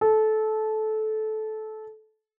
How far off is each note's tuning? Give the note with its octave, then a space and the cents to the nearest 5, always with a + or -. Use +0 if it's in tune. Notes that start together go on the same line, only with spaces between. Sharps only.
A4 -20